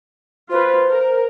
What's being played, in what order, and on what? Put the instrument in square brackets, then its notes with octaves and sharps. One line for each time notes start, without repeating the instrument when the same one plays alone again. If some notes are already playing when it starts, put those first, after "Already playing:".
[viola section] F4 B4 [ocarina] C5
[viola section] A#4